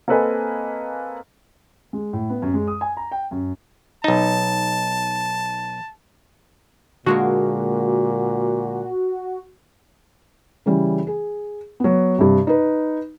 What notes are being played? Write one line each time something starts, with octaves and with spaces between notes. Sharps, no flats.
A#3 C4 A4 B4 D#5 G#5
G#3
A2
B3
F#2
G#3
D#6
G#5
A#5
G5
F#2
B1 D#4 A5
A#2 D3 G#3 A#3 F#4
C#3 E3 G3
G#4
F#3 B3
G2 C3
D#4 B4